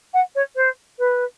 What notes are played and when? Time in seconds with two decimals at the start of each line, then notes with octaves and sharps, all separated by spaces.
0.14 F#5
0.35 C#5
0.56 C5
0.99 B4